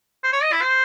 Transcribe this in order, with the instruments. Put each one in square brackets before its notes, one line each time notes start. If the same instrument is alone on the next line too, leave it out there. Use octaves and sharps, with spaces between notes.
[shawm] C5
C#5
D#5
E4
C5